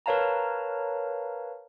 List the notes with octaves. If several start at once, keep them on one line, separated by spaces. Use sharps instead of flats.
A#4 B4 C#5 F5 A5 A#5